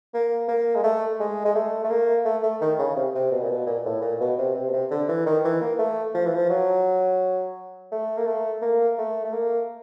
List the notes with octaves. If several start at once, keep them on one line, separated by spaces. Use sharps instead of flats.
A#3
A#3
G#3
A3
G#3
G#3
A3
A3
A#3
A3
A3
D#3
C#3
C3
C3
B2
A#2
B2
A#2
A2
A#2
B2
C3
C3
B2
C3
D3
E3
D#3
E3
A#3
A3
F3
E3
F3
F#3
A3
A#3
A3
A#3
A3
A3
A#3